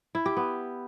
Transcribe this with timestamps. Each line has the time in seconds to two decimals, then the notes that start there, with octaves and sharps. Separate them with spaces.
0.15 E4
0.26 G4
0.37 B3